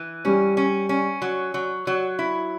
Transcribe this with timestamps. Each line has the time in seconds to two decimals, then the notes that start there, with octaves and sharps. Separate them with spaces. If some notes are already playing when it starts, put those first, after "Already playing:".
Already playing: E3
0.25 G3 C#4
0.57 C#4
0.89 C#4
1.22 F#3
1.54 F#3
1.87 F#3
2.19 E4